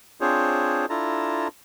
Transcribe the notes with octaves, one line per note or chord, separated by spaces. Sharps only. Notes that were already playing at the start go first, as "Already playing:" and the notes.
C4 D4 F4 G#4 C5 C#5
D4 E4 F4 A4 A5 A#5